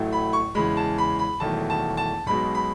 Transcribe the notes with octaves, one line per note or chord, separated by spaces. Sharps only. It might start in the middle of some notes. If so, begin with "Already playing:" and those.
Already playing: A1 A2 F#3 A3
B5
C#6
E2 C#3 E3 G#3 B5
A5
B5
B5
E1 E2 D#3 F#3 A3 A5
A5
A5
B1 B2 G#3 B5
B5